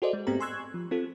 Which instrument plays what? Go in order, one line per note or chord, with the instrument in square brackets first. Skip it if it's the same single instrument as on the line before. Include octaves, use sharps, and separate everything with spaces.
[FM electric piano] F#4 G#4 A4 C5 D5 D#5
G#3
G#2 A3 B3 C4 G4 A#5
G#5 C6 C#6 E6 F#6 G#6
F3
C4 F4 A4